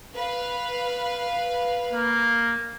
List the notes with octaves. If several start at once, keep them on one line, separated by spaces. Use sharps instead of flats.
B4 F5
A#3